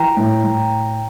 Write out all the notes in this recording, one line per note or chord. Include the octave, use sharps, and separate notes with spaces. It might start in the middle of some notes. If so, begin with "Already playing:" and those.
Already playing: E3 G5 A#5
A2
A2